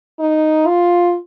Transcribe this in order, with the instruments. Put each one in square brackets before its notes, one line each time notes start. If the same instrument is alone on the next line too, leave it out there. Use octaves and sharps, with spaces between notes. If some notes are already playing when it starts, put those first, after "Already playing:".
[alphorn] D#4
F4